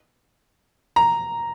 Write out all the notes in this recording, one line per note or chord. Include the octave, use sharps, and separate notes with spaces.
A#5